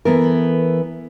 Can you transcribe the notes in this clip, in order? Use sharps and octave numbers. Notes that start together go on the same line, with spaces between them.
E3 B3 A4 A#4